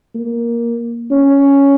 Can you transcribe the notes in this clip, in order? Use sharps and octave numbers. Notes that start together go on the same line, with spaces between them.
A#3
C#4